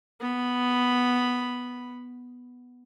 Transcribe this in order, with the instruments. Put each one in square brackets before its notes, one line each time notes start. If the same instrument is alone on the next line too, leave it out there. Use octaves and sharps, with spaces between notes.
[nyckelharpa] B3 B5